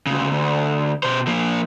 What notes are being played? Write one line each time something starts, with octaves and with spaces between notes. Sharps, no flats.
D2 C#3
D2
B2 C5
F3 A#3